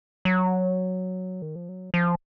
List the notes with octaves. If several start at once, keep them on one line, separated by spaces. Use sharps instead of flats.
F#3
D#3
F3
F#3
F3